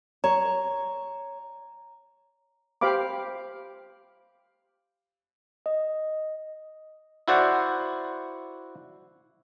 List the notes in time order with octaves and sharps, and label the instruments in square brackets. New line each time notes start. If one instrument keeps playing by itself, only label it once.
[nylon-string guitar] C#5 [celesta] A#5
[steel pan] G4 C5 F5 B5 D6
[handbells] D#5
[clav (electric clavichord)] E4 F#4 C5 D5 F#5